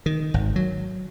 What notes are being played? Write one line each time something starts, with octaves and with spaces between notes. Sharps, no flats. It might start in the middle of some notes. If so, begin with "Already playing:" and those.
D#3
G#1
F#3